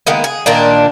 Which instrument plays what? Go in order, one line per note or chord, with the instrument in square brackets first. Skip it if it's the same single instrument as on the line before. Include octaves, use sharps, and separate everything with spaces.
[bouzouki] D#3 G#3 A#3 B3
G#4
A#2 D#3 A#3 D4